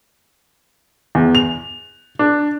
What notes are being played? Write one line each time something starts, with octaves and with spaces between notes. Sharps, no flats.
E2
F7
D4